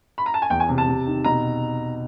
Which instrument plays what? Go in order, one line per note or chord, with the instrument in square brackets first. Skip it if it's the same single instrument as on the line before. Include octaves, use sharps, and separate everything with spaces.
[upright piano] B5
A#5
A5
G#5
[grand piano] E2 [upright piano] G5
[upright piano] G#5
[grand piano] C3
[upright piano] A5
[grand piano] C3
D#3
[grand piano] B2 [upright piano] A#5